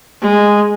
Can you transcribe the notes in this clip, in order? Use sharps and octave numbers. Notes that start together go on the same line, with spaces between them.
G#3